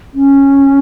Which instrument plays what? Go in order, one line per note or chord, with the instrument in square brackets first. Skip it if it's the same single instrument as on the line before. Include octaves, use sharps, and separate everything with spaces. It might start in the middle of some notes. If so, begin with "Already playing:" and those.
[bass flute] C#4